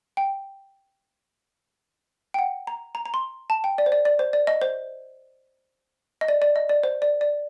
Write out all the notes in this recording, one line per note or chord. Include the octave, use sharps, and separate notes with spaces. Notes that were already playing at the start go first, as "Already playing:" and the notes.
G5
G5
F#5
A#5
A#5
A#5
C6
A5
G5
D5
C5
D5
D5
C5
D5
D#5
C5
D#5
D5
D5
D#5
D5
C5
D5
D5